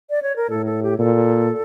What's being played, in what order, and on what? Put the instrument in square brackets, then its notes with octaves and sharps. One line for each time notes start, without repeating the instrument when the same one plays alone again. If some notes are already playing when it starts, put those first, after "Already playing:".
[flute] D5
C#5
A#4
[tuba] A2 [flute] A4
[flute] A4
G4
[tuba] A#2 [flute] A4